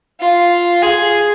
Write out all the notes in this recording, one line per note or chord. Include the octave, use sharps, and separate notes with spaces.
F4
G#4